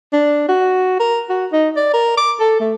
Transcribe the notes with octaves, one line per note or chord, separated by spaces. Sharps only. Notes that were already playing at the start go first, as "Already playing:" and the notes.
D4
F#4
A#4
F#4
D#4
D5
A#4
D6
A4
A3